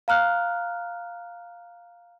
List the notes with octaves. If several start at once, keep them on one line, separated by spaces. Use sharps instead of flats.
F5 A#5 F6 F#6